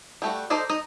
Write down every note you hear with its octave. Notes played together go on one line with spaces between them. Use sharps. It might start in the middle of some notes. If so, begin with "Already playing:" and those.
G3 A3 F#4
D#4 A4 C5 D5 D#5
D#4 D#5